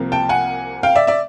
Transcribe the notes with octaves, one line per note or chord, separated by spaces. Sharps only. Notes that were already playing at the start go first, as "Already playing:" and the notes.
Already playing: C2 C3 F3 A#3
G5 A5
F#5 G#5
F5 G5
D5 E5
D5 E5